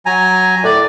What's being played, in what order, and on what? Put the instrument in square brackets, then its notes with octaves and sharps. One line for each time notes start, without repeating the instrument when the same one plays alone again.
[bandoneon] F#3 G#5 A#5
[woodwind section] A2 D5